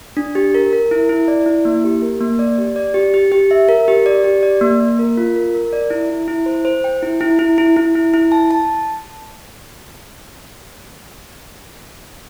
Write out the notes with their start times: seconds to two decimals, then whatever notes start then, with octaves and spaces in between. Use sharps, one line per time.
0.17 D4
0.35 G4
0.55 A#4
0.73 A#4
0.91 E4
1.09 E4
1.28 D5
1.46 E4
1.65 A#3
1.84 G4
2.02 A#4
2.21 A#3
2.39 D5
2.58 G4
2.76 D5
2.94 G4
3.14 G4
3.32 G4
3.51 E5
3.69 A#4
3.88 G4
4.06 D5
4.24 G4
4.43 D5
4.61 A#3
4.80 A#3
4.99 A#4
5.17 F4
5.36 A#4
5.55 A#4
5.73 D5
5.90 E4
6.10 E4
6.28 E4
6.46 C5
6.65 C5
6.84 G5
7.03 E4
7.21 E4
7.39 E4
7.58 E4
7.76 E4
7.95 E4
8.14 E4
8.32 A5
8.51 A5